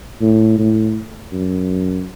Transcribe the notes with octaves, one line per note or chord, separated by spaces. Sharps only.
A2
A2
F#2